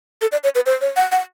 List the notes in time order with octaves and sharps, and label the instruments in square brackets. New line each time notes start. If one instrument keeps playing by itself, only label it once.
[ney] A4
D5
C#5
B4
C5
C#5
F#5
F#5